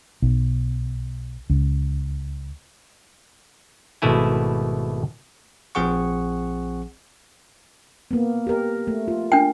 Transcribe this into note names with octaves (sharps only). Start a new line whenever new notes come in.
B1
C#2
G#1 B2 A3 E4 G#5
A#1 F3 C4 G#4 F#5 C#6
A#3 B3
G4 A#4
A3
F4
D4 A#4 G5